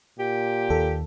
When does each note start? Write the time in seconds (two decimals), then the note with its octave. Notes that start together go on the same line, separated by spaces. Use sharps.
0.19 A#2 G4
0.70 D#2 A4